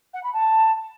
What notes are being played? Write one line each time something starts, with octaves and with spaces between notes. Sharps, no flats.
F#5
B5
A5